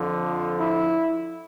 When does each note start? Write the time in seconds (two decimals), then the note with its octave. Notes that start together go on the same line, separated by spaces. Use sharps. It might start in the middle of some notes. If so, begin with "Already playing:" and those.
Already playing: F2 D3 F3
0.59 E4